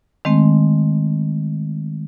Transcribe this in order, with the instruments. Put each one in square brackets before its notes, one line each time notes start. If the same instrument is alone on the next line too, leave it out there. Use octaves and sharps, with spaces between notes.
[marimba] D#3 G#3 A3 C4